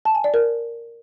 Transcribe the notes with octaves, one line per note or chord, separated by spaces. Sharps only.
A5
G#5
D5
A#4